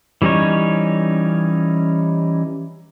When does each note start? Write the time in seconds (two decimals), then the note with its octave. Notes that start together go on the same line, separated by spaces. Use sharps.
0.22 E3 G3 C#4 D#4 C#5